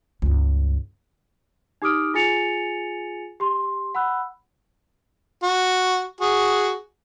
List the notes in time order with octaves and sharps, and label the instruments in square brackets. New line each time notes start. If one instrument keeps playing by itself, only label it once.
[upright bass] C#2 G2
[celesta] D#4 G4 D6 D#6 F6 D7
F4 G#4 G#5 A6 C#7 F7
G4 C6
F#5 B5 E6 F#6
[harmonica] F#4
F#4 G#4